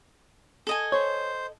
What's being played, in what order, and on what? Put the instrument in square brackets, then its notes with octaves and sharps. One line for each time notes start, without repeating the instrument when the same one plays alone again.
[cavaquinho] A4 D#5 G#5
[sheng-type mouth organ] C5 [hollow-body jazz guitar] C#5